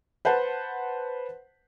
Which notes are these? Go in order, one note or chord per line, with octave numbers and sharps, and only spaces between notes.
B4 C5 F#5 A5